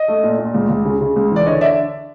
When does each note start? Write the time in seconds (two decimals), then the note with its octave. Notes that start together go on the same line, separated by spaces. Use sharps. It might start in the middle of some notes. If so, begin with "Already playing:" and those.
Already playing: D#5
0.08 A3
0.23 A#2
0.39 A#2
0.54 C#2
0.69 C#2
0.85 C#3
1.01 C#3
1.16 C#2
1.31 E3 D5
1.46 D3 C#5 D#5
1.61 D5 E5